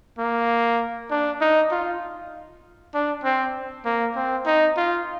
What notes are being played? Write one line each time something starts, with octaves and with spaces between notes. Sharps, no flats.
A#3
D4
D#4
F4
D4
C4
A#3
C4
D#4
F4